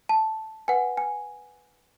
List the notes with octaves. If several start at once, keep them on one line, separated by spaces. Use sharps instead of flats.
A5
B4 F#5 G#5
G#5